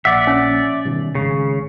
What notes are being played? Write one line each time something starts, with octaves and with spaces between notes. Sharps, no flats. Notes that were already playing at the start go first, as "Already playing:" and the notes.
A#1 D5 E5 F#5
C#4
B2 D#3 G3
G#1 C#3